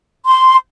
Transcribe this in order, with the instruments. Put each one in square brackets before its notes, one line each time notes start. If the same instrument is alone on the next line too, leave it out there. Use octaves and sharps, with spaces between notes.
[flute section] C6